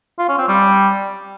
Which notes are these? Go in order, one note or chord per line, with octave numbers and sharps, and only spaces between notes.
F4
C#4
C4
G3